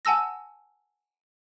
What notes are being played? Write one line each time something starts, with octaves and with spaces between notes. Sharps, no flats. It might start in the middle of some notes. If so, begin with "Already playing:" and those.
F#5 G#5 A5 E6 A#6